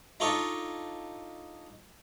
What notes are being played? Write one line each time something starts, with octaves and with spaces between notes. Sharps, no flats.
D4 D#4 F4 A4 C#5 D#5